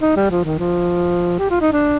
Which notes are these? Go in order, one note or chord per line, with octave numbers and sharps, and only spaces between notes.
D#4
G3
F3
D#3
F3
G4
F4
D#4
D4